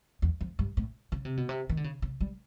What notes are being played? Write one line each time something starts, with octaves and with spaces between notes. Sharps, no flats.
E2
F2
G2
A2
C#3
C3
B2
C3
D#3
D3
C#3
C#3
G3